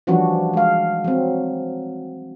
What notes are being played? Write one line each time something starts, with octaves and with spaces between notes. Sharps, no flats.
E3 F3 G3 C#4 D4 F#4
G#3 F5
F#3 C4